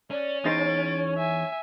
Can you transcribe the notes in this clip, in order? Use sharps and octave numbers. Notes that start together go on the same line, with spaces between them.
C#4 D5
E2 D#4 C5 C#5 A6 D7
E5 G#5